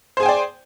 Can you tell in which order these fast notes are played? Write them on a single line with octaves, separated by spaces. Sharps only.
C5 G#4 G#5 G5 D5